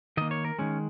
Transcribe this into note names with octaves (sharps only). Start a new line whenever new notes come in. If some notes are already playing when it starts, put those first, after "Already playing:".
D#3 A#3 D#5
C#5
A#4
D#3 G#3 C#4